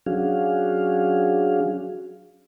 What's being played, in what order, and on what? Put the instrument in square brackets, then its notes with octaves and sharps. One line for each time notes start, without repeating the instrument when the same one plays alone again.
[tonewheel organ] F#3 C#4 D4 F#4 G#4 F5